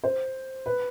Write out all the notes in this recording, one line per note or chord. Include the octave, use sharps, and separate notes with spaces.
C5
B4